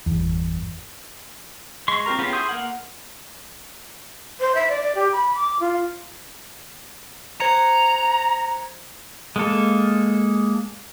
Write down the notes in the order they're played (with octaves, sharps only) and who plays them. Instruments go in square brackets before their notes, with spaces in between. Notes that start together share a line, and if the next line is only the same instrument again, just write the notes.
[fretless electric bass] G1 E2
[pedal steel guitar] G#3 C6 C#6
C4 F4 G4 A#4 A#5
B3 C#4 F4 G4 G#4
E4 G#4 C6 D#6 G6
A#3 A#4 F#5
[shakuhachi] C5
E5
D5
D5
G4
B5
D6
F4
[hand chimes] C5 G#6 C#7 [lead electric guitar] A#5
[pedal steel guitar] G#3 A#3 A4